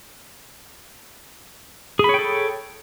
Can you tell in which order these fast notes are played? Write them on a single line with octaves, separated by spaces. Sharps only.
G#4 B5 C#5 G5 A4